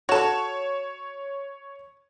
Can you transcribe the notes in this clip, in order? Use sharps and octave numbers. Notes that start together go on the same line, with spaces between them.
F#4 A4 C#5 E7